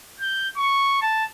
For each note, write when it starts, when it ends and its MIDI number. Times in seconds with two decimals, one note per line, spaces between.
0.20 0.49 91
0.57 0.99 85
1.02 1.25 81